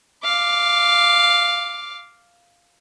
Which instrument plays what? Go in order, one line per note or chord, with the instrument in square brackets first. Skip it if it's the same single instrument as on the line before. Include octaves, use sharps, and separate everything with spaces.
[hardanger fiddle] F5 D6